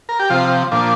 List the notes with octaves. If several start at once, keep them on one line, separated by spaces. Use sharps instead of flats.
A#4
G4
C3 F3 F4
A#2 F3 D4